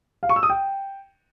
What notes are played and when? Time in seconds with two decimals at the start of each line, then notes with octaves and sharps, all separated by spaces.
0.23 F5
0.29 C#6
0.36 E6
0.43 D#6
0.50 G5